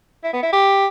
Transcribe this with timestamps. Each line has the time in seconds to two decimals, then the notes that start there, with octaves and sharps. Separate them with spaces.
0.24 E4
0.33 B3
0.43 E4
0.53 G4